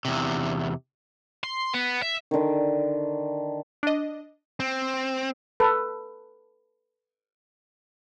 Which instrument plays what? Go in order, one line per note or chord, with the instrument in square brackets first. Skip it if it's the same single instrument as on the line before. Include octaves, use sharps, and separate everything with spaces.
[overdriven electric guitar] E2 C3
[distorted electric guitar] C6
B3
E5
[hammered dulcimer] D3 D#3
[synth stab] D4 D#5
[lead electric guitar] C4
[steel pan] A4 B4